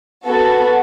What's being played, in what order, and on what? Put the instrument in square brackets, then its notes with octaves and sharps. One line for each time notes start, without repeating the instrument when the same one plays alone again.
[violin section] B3 F#4 A4